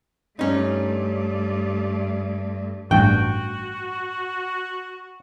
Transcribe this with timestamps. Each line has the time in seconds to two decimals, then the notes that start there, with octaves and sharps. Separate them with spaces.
0.39 G2 A3 C#4 D#4
2.91 A1 G2 F#4 G5 A5